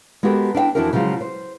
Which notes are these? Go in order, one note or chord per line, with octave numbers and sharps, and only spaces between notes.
G#3 B3 F#4 G4 A4 A#4
D4 E4 F5 G5
F2 E3 D4 E4 F#4 A#4
C#3 F3 F#3 G#3 F4
C5